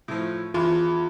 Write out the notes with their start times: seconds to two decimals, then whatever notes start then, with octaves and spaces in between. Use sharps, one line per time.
0.08 A2 F3
0.54 E2 F4